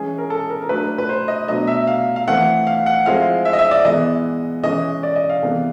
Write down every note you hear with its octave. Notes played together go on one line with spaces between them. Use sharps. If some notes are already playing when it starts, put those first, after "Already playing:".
Already playing: E3 G#3 C#4 G#4
A#4
A4
A#4
A#4
F#3 A3 D4 B4
B4
C5
D#5
B2 F#3 A3 D4 D#5
E5
F5
F5
E3 A3 C4 F#5
F5
F#5
F3 G#3 C4 E4 F5
E5
D#5
E5
D5
E3 G#3 B3 D#5
E3 G#3 C#4 E4 D#5
D5
D#5
F5
C3 E3 G#3 B3